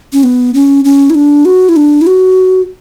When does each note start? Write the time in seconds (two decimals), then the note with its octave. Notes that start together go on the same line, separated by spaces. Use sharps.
0.13 C#4
0.23 B3
0.54 C#4
0.85 C#4
1.10 E4
1.15 D4
1.45 F#4
1.69 E4
1.76 D4
2.01 E4
2.07 F#4